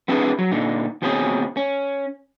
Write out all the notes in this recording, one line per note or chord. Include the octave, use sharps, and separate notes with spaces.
B3 C4 D4 E4 G#4 B4
F#3
A#2 D3 D#4
D#2 B2 C4 C#4 E4 G#4
C#4